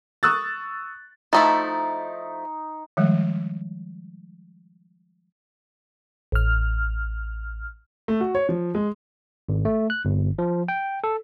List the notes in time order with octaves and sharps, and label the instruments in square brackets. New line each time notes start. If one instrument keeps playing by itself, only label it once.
[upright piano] C#6 D#6 E6 F#6 A6
[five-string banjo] F3 A3 E4 [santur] D#4
[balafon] D#3 F3 G3 G#3
[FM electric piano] A1 F6
[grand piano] A3
F#4
C#5
F3
G#3
[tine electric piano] G#1
A3
F#6
G1
F3
G5
A4